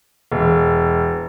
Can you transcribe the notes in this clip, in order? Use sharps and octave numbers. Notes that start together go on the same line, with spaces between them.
E1